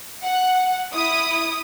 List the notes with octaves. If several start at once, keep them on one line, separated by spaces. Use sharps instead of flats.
F#5
E4 D#6